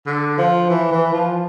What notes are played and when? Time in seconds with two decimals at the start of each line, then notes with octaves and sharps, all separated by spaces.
0.06 D3
0.38 F3
0.70 E3
0.92 E3
1.13 F3